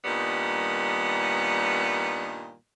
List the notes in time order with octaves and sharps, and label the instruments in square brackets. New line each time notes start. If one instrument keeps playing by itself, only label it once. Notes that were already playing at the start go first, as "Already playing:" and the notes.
[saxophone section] G2 A#2 D#3 G3 B3